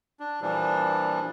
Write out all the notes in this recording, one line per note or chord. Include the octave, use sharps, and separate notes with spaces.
D4
A#2 E3 F3 G3 D4